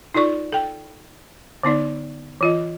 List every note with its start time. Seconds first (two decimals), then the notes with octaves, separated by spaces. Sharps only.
0.14 D#4 F4 A4 D5 C#6
0.52 A4 G5
1.63 D3 B3 D#4 D5
2.41 E3 F4 D#5